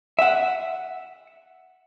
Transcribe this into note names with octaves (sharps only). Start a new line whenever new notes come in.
E5 F#5